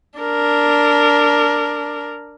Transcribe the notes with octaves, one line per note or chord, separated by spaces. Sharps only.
D4 A#4